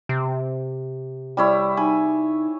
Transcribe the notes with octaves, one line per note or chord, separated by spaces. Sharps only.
C3
G3 E4 C#5
D#4 G#5